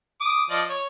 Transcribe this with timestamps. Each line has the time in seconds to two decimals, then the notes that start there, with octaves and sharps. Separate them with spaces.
0.20 D6 D#6
0.50 F3 D5 D#5
0.70 C#5